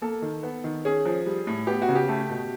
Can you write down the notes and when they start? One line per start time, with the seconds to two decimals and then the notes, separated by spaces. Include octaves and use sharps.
0.02 A#3 A4
0.22 D#3
0.43 B3
0.64 D#3
0.85 C#4 G#4
1.05 F3
1.26 G3
1.47 A2
1.67 B3 G4
1.82 F#4
1.89 C#3
1.95 G4
2.08 A3
2.29 B2